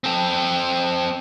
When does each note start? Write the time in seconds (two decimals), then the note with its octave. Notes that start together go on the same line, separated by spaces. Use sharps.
0.04 C4 A4